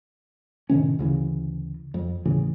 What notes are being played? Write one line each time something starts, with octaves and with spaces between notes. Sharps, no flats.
A2 C3 D#3 C#4
D2 C#3 E3
F2
D#2 A2 C#3 E3